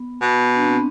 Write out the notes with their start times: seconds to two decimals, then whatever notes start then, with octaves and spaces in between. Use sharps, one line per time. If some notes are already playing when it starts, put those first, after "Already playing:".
Already playing: B3
0.21 B2
0.56 D4
0.65 C4
0.74 B3